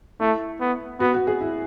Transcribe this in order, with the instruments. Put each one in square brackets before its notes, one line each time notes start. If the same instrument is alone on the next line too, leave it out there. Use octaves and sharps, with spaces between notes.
[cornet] A3 [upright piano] E4
[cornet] B3
[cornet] B3 [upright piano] F#4
[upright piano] F#4
G#4
E4